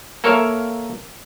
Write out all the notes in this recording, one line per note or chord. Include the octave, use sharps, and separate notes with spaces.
A#3 A4 A#4 C#5 E5 F5